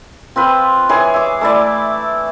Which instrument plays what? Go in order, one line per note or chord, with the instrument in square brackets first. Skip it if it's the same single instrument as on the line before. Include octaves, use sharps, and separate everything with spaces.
[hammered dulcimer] C4 F4 B4
E3 G#4 C#5
E5 D6
A3 E4 D5